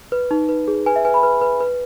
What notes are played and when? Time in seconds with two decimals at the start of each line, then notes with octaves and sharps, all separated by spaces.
0.12 B4
0.31 D#4
0.49 B4
0.68 G#4
0.86 B4 G#5
0.96 E5
1.05 B4 G#5
1.14 B5
1.23 B4
1.42 B4
1.61 B4